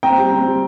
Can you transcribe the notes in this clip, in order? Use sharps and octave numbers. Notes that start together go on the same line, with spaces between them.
C4 G5 A#5
G3
C4
G3